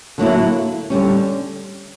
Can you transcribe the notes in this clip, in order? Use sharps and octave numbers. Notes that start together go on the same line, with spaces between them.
D3 F#3 A#3 E4
D3 G3 C#4